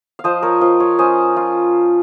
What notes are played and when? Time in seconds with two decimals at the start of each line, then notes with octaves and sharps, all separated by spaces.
0.19 F5
0.24 F3 C5 D#5
0.42 A#4 C#5
0.61 F4 C5 D#5
0.80 C#5 F5
0.98 C#4 C5 D#5
1.36 F4